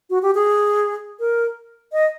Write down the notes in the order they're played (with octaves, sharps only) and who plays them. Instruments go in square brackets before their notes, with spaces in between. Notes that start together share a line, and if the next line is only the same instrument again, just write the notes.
[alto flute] F#4
G4
G#4
A#4
D#5